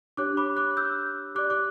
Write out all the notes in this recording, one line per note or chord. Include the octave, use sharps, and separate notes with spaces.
D4 G4 C#5 D6 F#6
B5 D6
D6 F#6
E6 G6
G4 D5 D6 F#6
D6 F#6